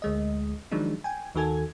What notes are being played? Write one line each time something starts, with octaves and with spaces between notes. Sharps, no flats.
D2 G#3 D#5
D#3 F3 F#3 G#3 D4 D#4
G5 G#5
D#2 D#3 F#4 A4 G#5 G#6